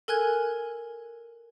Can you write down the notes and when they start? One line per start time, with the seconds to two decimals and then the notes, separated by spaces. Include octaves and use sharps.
0.08 A4 A#4 G#5 F#6 G#6